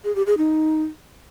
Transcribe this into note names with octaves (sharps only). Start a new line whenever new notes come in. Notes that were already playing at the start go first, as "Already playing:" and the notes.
G#4
G4
G#4
D#4